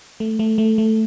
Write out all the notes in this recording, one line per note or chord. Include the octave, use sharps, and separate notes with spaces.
A3
A3
A3
A3